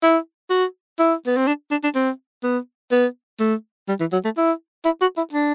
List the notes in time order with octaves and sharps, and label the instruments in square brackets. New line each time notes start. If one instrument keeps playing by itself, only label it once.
[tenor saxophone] E4
F#4
E4
B3
C4
D4
D4
D4
C4
B3
B3
A3
G3
E3
F#3
A3
E4
E4
F#4
E4
D4